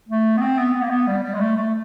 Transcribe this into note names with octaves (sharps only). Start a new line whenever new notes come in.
A3
B3
C4
B3
B3
A#3
B3
G3
G3
G#3
A3
A3